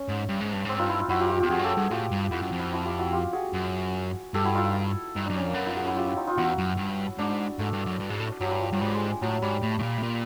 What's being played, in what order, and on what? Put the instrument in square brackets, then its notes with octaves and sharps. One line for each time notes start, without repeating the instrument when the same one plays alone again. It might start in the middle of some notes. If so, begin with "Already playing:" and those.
Already playing: [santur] C#4
[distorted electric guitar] G#2
G2
G#2
G2
[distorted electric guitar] G#2 [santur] C4
[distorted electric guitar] G2 [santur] D#4 F4
[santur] E4
D#4 F4
[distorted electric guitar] F#2 [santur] E4 F#4
[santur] F4 G4
F4 G4
[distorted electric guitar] E2 [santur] F4 G4
[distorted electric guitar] F2 [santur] F#4 G#4
[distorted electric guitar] G2
[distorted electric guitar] F#2 [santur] G4 A4
[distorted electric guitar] G2 [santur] F#4 G#4
[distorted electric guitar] A2 [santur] F4 G4
[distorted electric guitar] G2
[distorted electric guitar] F2 [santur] E4 F#4
[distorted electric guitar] F#2
F2
[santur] E4
E4 F#4
F4 G4
E4 F#4
F4 G4
F#4 G#4
[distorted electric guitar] F#2
[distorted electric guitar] G2 [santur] G4 A4
[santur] E4 F#4
D#4 F4
E4
[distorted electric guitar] G2 [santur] D#4
[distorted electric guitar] F#2 [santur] D4
[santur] C#4
[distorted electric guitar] F2 [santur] A#3
[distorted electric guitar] F#2 [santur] B3
[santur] D#4 F4
F#4 G#4
E4 F#4
F4 G4
E4 F#4
D#4 F4
D#4 F4
[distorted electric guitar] E2 [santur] E4 F#4
[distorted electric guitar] F#2
G2
[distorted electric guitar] G#2 [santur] D4
[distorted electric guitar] G#2 [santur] A3
[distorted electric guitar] G2
F#2
G2
G#2
A2
[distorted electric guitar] G2 [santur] F#3
[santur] G3
F3
[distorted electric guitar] G2 [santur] F#3
[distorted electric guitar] G#2 [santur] G3
[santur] G#3
G#3
[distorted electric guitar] A2 [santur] F#3
[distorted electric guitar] G#2 [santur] G3
[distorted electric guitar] A2
A2
A#2
A2
A#2